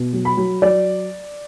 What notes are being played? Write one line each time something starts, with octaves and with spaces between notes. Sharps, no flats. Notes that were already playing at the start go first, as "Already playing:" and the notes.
Already playing: B2
F#3
B5
F#3
F#3 D5